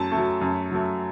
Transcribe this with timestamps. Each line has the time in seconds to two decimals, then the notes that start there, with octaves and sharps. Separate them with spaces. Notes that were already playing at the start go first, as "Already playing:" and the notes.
Already playing: F#2 A3 A5
0.12 A3
0.17 F#3
0.41 F#2
0.71 F#3 A3